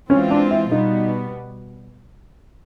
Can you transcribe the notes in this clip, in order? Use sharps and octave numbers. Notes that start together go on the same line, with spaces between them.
E3 G#3 C4 C#4 F4
D4
E4
B2 G3 B3 D#4